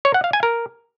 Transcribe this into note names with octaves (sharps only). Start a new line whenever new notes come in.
C#5
F#5
F5
G#5
A#4